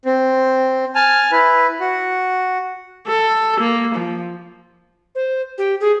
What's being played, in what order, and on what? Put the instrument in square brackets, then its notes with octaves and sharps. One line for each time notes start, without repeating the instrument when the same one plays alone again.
[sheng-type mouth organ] C4
G#5 A5 F6
E4 B4
F#4
[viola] A4
A#3
F3
[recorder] C5
G4
G#4